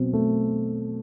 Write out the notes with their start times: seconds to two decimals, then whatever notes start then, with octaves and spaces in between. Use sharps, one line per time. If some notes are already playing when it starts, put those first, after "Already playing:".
Already playing: B2 F#3 C4
0.13 A3